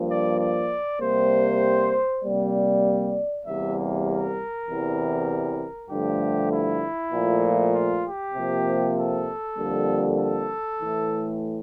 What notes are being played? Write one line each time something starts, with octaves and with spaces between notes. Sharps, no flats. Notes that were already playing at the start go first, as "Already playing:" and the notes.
Already playing: G2 F3 A#3
D5
D5
C3 G3 A#3 C5
C3 G3 A#3 D5
E2 C3 G3 A#3 E5
A#4
E2 C3 E3 G3
G2 D3 F3 A3 G4
E4
A#2 F3 A3
F4
G4
C3 F3 A#3
A4
F2 D3 G3 A#3
A4
A2 E3 A3